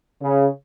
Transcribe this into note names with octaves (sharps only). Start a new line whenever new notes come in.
C#3